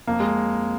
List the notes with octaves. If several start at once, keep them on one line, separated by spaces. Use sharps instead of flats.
F2 A#3
G#3